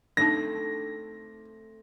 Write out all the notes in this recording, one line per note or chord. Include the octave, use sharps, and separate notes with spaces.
A3 C4 D4 D#4 A5 A#6